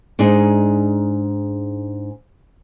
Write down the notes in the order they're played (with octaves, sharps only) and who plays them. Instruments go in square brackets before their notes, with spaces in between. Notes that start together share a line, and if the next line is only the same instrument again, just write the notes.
[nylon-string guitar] G#2 D4 D#4 G#4